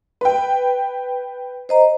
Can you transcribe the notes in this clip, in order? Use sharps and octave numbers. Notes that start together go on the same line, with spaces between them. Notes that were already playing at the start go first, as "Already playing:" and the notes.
B4 G5
C5 D#5 A#5